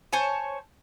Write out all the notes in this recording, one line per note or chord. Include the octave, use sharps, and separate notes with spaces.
C5 C#5 G#5 A5